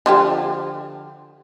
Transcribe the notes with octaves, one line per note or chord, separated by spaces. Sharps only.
D3 F3 G4